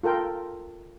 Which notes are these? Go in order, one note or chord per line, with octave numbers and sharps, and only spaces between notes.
F4 A4 A#4 G5